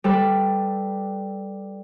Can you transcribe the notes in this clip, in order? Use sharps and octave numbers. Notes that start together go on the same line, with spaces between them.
G3 A4 B4